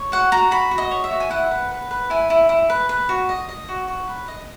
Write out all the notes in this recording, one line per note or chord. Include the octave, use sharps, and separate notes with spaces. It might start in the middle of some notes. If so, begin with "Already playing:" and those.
Already playing: C#5
F#4 F#5
F#4 A#5
F#4 B5
F#4
D#5
C#5
E5
F#4
G#5
E4 F#5
B4
B4
B4
E4 G#5
E4
E4
B4
B4
F#4
D#5
D#5
F#4
F#4
B4
D#5